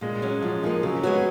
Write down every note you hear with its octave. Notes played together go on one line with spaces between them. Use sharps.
A#2 G#3
F#3 C#4 F#4
F3 F#3
F3 A#3 D#4 G#4
C#3 F#3
G#3 B3 F#4 C#5